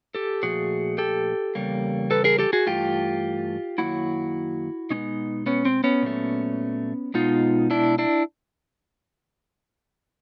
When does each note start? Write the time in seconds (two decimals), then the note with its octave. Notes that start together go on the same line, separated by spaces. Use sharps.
0.15 G4 A4
0.43 A#2 F3 A3 F#4 G#4
0.98 G4 A4
1.55 E2 C#3 G3 A#3
2.11 A4 B4
2.24 G#4 A#4
2.39 G4 A4
2.53 F#4 G#4
2.66 G2 E3 A3 F4 G4
3.78 F#2 D#3 F#3 A#3 E4 F#4
4.90 B2 G#3 B3 C#4 D#4
5.46 B3 C#4
5.65 C4
5.84 B3 C#4
6.02 A#2 F#3 A3
7.14 B2 G#3 B3 D#4 F4
7.70 D4 E4
7.99 D4 E4